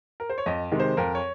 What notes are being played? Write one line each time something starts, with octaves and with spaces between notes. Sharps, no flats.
A#4
C5
C#5
F2 D#5
C3 D#3 G#3
C5
F2 A#4
C#5